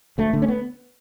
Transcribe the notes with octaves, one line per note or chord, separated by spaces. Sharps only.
D2 A3
D3 A3
C#4
B3